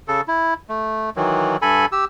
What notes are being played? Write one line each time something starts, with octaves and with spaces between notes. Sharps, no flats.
C#3 A4
E4
A3
D#3 E3 F#3
G2 A4 G#5 B5
G4 E6